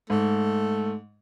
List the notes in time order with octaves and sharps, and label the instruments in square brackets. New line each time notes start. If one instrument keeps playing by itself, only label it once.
[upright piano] G#2 [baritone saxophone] A3